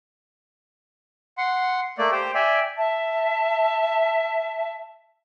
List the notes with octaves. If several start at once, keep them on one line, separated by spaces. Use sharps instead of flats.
F#5 C6
A3 A#3 D5
G4 C5 G5
D5 E5 G5 G#5
E5 A5